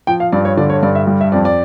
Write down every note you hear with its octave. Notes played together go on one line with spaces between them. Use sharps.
F3 G5
F5
G2 D5
C#5
D3 D5
C#5
G2 D5
E5
G3
E5
F2 D5
D5